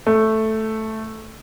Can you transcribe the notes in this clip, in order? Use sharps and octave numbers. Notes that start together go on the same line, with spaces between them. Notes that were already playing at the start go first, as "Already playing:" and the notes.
A3